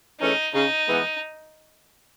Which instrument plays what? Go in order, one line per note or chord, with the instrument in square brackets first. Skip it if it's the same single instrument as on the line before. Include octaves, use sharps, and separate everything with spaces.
[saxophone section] E3 A3 C#4 G#4 [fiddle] D#4
[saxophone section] C#3 [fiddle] D#4
[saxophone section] E3 G#3 B3